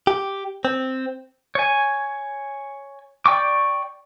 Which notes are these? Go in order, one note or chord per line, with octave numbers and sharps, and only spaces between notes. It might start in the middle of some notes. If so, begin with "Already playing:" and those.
G4
C4
C#5 G#5
D5 G5 C#6 D6